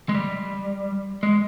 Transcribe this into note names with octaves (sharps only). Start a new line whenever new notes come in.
G#3
G3
G#3